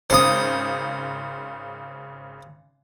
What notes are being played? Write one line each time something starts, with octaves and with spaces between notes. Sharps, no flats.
G#1 C#3 C5 D#6